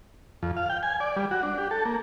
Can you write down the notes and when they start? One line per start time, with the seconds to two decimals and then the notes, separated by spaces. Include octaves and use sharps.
0.43 F2
0.56 F5
0.70 G5
0.83 G#5
1.00 D5
1.16 G3
1.31 F#4
1.43 D4
1.58 G4
1.71 A4
1.85 A#3